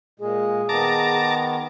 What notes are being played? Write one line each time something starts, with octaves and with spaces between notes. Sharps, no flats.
A#2 G#3 G#4
D#3 B3 A5 A#5 D6